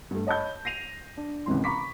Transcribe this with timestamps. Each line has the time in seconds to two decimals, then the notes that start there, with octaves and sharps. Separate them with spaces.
0.11 G2 A3
0.27 C#5 D#5 A5 B5 G6
0.65 A#6 C7 D#7 F7
1.17 D4
1.46 G#1 C#2 C3 E3 C#4 C6
1.64 A#5 B5 C#6 D6 B6